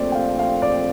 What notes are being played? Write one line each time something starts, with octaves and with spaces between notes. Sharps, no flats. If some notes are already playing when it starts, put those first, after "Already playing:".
Already playing: A#1 A#2 A3 C4 D5
G5
F5
F5
D5